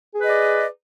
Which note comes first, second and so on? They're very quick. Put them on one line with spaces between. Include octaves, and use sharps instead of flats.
G#4 B4 D#5 D5